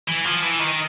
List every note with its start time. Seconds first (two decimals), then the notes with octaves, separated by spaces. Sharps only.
0.08 E3
0.25 F3
0.43 E3
0.60 D#3